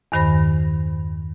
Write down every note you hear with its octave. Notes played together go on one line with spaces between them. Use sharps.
E2 G2 D#3 C5 B5 A#6